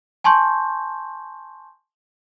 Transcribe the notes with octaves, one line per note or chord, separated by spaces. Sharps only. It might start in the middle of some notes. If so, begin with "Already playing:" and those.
G#5 A5 C6 C#6 G6